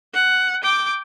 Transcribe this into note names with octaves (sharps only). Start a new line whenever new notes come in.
F#5
G5 D6